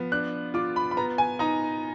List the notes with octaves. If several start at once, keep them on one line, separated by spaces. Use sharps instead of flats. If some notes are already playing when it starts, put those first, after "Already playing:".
Already playing: F3 B3
D4 F#6
F4 D6
B5
B5
B3 A#5
G#5
D#4 A#5